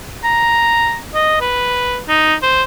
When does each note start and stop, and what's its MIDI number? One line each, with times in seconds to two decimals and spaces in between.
0.24 0.97 82
1.14 1.40 75
1.40 1.99 71
2.09 2.35 63
2.42 2.63 72